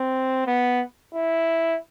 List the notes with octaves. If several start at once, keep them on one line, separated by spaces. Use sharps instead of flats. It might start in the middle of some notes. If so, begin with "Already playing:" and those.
Already playing: C4
B3
E4